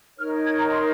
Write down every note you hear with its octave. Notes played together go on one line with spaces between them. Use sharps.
D#4 A#4 C#5 F6
G#6
A#5
C6